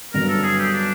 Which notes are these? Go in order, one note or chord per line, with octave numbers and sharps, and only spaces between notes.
G2 D3 F#3 B3 A#4
A4
G#4
G4
D4